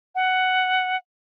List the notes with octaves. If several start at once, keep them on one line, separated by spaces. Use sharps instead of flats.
F#5